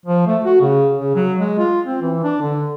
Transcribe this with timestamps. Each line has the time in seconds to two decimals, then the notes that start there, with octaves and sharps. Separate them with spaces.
0.06 F3
0.27 A3
0.45 F#4
0.61 C#3
0.98 C#3
1.16 F#3
1.39 G#3
1.58 F4
1.87 C4
2.02 E3
2.24 D4
2.42 D3